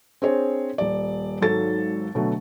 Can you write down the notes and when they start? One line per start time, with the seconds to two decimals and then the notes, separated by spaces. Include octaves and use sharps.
0.22 C4 D4 G#4 C5 C#5
0.78 D#1 D5
1.41 G#1 G#2 F#3 A4 A6
2.15 B2 D3 F#3 A3